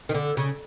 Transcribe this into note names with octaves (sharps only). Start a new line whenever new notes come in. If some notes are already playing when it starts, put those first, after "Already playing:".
D#3
D3
C#3